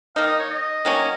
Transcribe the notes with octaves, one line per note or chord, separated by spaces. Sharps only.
D#3 A#3 D#4 F5
D#5
C#5
D#5
D#3 F#3 A#3 C#4